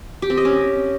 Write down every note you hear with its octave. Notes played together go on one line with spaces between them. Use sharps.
G4
C4
D#5
C#4